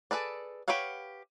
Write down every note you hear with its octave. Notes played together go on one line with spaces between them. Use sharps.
G#4 A4 B4 D5
G4 B4 C#5 F5 F#5